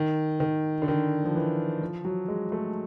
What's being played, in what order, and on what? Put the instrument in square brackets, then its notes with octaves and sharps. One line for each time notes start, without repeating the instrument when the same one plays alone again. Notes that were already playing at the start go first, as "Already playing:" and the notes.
Already playing: [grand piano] D#3
D#3
D3
D#3
F3
E3
F3
F#3
G#3
A3